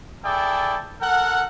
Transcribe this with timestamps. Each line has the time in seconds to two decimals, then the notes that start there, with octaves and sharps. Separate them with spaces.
0.24 E4 G#4 A4 D5 G5
1.01 A4 A#4 F#5